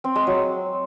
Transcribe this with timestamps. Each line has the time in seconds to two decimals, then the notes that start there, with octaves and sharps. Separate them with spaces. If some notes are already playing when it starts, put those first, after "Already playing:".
0.04 C4
0.16 G#3
0.27 F#3